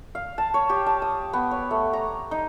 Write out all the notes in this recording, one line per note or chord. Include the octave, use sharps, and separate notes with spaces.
F5
A5
C#5
G4
A5
D#6
B3
C#5
A3
A#5
D#4